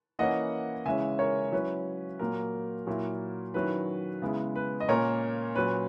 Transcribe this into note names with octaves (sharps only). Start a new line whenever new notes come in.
E3 A#3 C#4 E4 D#5 F#5
C#3 E3 G#3 C#4 E5 G#5
A#4 C#5
F#3 C#4 E4 B4
A#2 F#3 A#3 A#4
A#2 F#3 A#3 E4
D#3 F#3 C#4 E4 B4
C#3 G#3 B3 E4
B4
D#5
A#2 A#3 C#4 A#4 C#5
A#2 F#3 C#4 B4